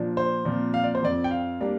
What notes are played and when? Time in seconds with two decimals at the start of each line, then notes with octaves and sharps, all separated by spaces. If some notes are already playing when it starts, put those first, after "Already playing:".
Already playing: A#2 F3 D4
0.17 C5
0.45 A#2 F3 C4
0.74 F5
0.84 D5
0.95 C5
1.02 F2 F3 C4 D5
1.24 G5
1.31 F5
1.61 G3 A#3 D4